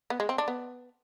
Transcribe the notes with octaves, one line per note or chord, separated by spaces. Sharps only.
B3
G#3
C4
D4
B3